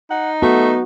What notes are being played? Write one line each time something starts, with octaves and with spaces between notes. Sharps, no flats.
D#4 F#5
A3 B3 F#4